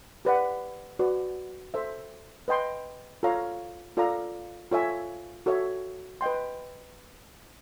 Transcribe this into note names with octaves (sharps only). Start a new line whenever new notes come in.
G4 B4 D5 F#5
F#4 B4 D5
A4 C5 E5
B4 D#5 G5 C6
F4 A4 C#5 F5 A#5
F4 A4 D5 F5 A#5
F4 A4 C#5 E5 G#5
F#4 A4 C#5 E5
B4 D#5 G5 C6